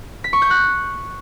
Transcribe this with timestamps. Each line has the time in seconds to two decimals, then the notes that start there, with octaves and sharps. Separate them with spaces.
0.24 B6
0.33 C#6
0.42 G6
0.50 F#6